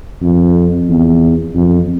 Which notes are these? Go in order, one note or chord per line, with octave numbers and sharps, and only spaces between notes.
F2
E2
F2